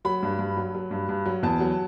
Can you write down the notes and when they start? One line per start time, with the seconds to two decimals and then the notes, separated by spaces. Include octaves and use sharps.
0.05 F#3 B5
0.23 G2
0.39 G2
0.57 F#3
0.75 F#3
0.91 G2
1.09 G2
1.26 F#3
1.43 E2 A5
1.60 F#3